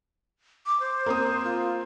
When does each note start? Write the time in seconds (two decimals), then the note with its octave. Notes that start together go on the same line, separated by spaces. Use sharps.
0.66 D6
0.80 C5
1.06 A#3 C4 D#6
1.44 F4